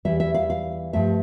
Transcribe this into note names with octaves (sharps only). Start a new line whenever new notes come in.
E2 C3 E3 G3 E5
E5
F5
F5
G2 F3 A3 E5